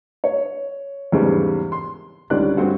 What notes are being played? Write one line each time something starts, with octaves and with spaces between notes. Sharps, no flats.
C#5
E2 G#2 C#3 G3
C6
C#2 D3 D#3 G3 D5 F#6
G2 C4 F#4 F#5